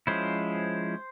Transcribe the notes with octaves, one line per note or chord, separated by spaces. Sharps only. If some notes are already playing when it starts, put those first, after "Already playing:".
F3 G#3 C#4 E4 C5